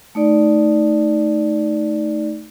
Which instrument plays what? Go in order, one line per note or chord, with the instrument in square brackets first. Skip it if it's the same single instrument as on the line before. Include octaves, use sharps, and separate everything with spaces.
[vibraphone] A3 D#4 D5